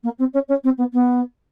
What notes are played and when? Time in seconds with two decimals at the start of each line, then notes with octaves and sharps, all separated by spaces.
0.03 A#3
0.18 C4
0.33 C#4
0.48 C#4
0.63 C4
0.77 B3
0.93 B3